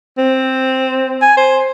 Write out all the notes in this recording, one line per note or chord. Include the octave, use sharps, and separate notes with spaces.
C4
G#5
C5